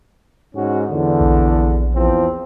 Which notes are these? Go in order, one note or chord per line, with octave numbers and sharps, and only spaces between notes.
G#2 C#4 F#4
E2 D3
A#1
E2 F3 C4